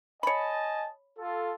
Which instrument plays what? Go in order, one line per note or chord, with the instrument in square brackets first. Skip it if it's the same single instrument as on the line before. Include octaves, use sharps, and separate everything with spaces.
[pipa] C#5 B5 [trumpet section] D#5 G#5 A5
[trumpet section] F4 A4